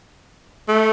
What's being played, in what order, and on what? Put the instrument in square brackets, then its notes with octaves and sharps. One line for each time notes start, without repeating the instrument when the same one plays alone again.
[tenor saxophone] A3